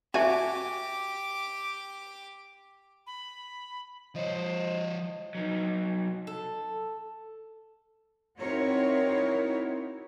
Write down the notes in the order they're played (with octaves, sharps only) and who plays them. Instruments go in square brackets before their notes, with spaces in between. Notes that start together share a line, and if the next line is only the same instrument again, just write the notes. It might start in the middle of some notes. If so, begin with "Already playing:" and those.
[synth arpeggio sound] F#4 G#5 [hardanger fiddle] G4 D6 [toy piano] E5 A5
[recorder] B5
[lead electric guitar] F3 C#5 [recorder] C5 [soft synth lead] D#5
[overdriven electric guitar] F#3 D#4
[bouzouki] A4
[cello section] C4 D#4 E4 F#4 A#4 C#5